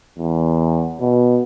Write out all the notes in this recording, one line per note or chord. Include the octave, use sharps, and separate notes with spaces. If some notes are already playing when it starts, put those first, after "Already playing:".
E2
B2